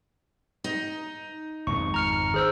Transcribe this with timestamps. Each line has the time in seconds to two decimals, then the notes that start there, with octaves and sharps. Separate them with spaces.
0.64 D#4
1.67 G#1 F2 G#2 C#6
1.94 A#5 F6 C#7
2.34 G#4 C5 E6